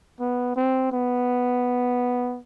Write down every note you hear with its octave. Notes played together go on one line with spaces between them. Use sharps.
B3
C4
B3